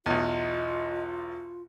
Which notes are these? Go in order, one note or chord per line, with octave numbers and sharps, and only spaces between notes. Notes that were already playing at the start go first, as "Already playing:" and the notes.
B1 E2 F4 D#5